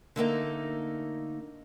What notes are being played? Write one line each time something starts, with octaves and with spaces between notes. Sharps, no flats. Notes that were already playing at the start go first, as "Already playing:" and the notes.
D3 A3 A#3 D#4